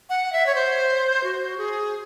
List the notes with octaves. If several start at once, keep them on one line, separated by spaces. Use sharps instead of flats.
F#5
E5
C#5
C5
F#4
G#4